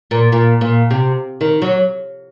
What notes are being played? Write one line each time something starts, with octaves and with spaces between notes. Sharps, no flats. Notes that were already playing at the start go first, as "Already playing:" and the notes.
A#2
A#2
A#2
C3
D#3
F#3